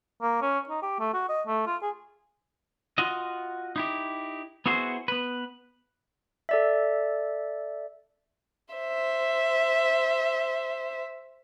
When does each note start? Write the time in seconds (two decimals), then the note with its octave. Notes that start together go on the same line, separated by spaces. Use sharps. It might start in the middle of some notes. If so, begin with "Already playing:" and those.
0.22 A#3
0.42 C#4
0.69 D#4
0.82 G4
1.00 A3
1.14 F#4
1.29 D#5
1.47 A3
1.67 F4
1.82 G#4
2.98 F4 F#4 D#5
3.76 D#4 E4 G4
4.66 B3 E4 F#4 G#4 C5
5.08 B3 B4
6.49 A4 D5 E5
8.74 C5 E5